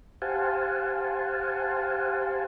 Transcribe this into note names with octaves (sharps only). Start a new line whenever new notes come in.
G4 C5 F5 F#5 G#5 A5